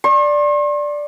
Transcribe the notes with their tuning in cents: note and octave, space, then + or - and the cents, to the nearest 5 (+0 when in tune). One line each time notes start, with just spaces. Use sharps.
D5 +0 C6 +45